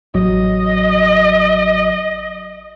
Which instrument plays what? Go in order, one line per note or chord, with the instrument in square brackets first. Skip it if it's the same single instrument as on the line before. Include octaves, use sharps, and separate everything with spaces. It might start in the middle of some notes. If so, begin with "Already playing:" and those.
[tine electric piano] A1 F#3 [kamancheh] D#5